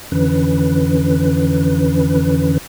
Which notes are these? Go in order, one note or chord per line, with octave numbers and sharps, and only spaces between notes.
F2 D3 E3 C#4 B4